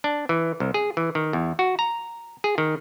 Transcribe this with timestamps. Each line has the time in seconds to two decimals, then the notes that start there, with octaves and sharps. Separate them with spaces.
0.04 D4
0.29 E3
0.60 C2
0.74 G#4
0.97 E3
1.15 D#3
1.33 E2
1.59 F#4
1.79 A#5
2.44 G#4
2.58 D#3